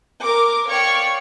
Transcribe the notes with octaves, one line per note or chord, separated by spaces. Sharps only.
A#4 D6
C#5 D5 F5 G5 C#6